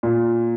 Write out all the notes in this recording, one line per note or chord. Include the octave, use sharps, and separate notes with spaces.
A#2